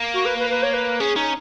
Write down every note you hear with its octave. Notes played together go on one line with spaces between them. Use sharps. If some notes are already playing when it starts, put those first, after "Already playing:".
Already playing: A#3
F#4
B4
B4
B4
C#5
B4
C#4 G#4
C#4 D#4